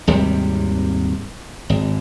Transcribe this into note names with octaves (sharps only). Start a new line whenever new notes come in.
G#1 D#2 C3 G3
G#1